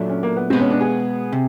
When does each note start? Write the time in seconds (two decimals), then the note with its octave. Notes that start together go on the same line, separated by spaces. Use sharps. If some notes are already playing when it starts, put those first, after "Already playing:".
Already playing: A#2 F#3 A3 D4
0.09 C#4
0.23 A#3
0.36 B3
0.50 B2 G#3 B3 C4
0.61 C#4
0.71 D4
0.81 G#4
1.32 C3